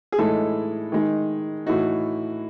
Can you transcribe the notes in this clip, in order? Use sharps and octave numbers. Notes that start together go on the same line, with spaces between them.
G#4
A2 E3 G#3 D#4 A4
D#3 G#3 D#4
A2 E3 A3 D#4 F#4